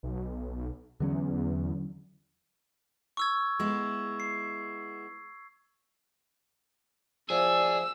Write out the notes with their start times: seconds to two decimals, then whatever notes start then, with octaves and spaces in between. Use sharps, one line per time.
0.03 B1
1.00 E2 D3 F#3 C#4
3.17 C#6 E6 G#6
3.60 G#3 B3 E4
4.20 C7
7.30 F3 G#4 D5 E5 E6